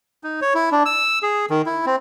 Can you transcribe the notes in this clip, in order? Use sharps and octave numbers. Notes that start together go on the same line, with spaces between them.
D#4
C#5
E4
D4
E6
G#4
D#3
E4
C4